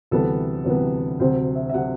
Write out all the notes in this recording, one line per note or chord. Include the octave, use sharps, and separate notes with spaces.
D2 C3 E3 G3 B3 A4
D2 C3 E3 G3 B3 B4
D2 C3 F#3 C4 C5
E5
E5
C3 F#3 C4 F#5